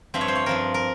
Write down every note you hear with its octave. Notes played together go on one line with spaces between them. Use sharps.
G2 F3 C4 E5
C#5
C5
C#5
G2 F3 C4 A#4
A#4